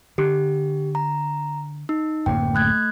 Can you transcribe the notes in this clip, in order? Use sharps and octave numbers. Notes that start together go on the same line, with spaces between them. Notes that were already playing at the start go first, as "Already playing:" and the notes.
D3 G4
A#5
D#4
D1 F#2 A#3 G5
A3 F#6 G#6